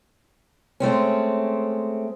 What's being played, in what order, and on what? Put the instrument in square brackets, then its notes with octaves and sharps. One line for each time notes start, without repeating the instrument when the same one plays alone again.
[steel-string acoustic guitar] G#3 A3 C4 C#4